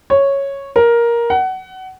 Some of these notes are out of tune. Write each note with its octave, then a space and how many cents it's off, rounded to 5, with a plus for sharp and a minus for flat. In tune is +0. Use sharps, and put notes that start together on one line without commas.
C#5 -5
A#4 +10
F#5 +25